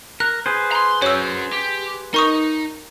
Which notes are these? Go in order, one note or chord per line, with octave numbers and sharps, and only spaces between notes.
A#4 F#6
G#4 B4 C5
A#5 C6
C#4 F#4 C#5 E6
G4
D#4 A#4 C#6 D#6